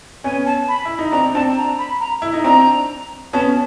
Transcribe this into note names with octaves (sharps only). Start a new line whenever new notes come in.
B3 C#4 G#5
A5
B5
E4
D#4
C4 D4 A#5
C4 D4 A5
A#5
B5
A#5
E4
D#4
C4 D4 A#5
B3 C#4 A5